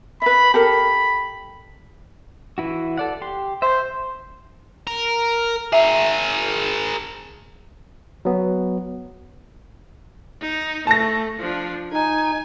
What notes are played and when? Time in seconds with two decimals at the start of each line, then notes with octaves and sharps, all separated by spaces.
0.22 B4 E5 B5
0.54 G4 A4 A#4 B5
2.58 E3 E4 F#4
2.98 A4 D5 F#5
3.22 G4 C6
3.62 C5 E5 G6
4.87 A#4
5.73 G#4 A#4 E5
8.25 F#3 B3
10.41 D#4
10.87 A3 A5 A#6
11.39 F3 D4
11.92 D#4 G#5